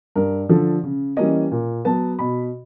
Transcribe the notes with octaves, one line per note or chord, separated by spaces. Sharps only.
G2 A#4
D3 F3 A4
C#3
E3 G3 A#3 C#4 D#5
A#2
F#3 B3 A5
B2 B5